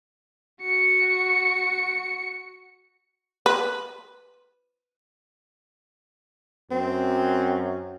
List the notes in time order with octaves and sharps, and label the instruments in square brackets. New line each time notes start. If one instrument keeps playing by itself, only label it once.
[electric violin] F#4 C#7
[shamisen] B4
[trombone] F#2 [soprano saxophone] C4